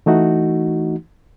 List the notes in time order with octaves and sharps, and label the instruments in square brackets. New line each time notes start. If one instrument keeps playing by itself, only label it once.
[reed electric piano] E3 A3 D#4 F#4